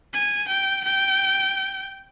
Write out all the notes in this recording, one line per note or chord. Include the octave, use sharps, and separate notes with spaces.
G#5
G5
G5